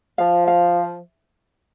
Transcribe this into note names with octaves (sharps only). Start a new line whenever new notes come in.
F3 F5
F5